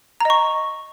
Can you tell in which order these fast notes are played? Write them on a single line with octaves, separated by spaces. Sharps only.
A#5 D#5 C#6